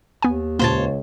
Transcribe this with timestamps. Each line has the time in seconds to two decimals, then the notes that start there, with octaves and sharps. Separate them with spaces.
0.22 D#2 B3 G#5
0.59 C#2 A#2 A#3 C5 C#5 A5